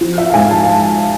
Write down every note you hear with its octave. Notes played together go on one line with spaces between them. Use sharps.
F3
E5
F5
G#2 G#5
A5